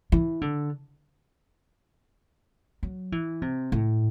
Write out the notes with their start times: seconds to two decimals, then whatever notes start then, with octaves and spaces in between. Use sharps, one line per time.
0.12 E3
0.41 D3
2.83 F#3
3.12 E3
3.42 C3
3.72 A2